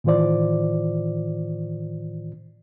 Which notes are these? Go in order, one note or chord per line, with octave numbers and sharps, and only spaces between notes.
A2 D#3 E3 F4 C5 D5